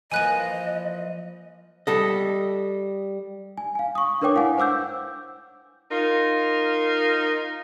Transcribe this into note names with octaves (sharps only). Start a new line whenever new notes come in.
E3 F3 A#3 D#5 G#5 F#6 D#7
G3 A4 D#5
G#5
F5 G#5
C#6 D#6
D4 A#4 B4 C#5 G5 D6
E4 F5 F#5 G#5
C5 F#5 D6 E6 G6
D#4 F4 A#4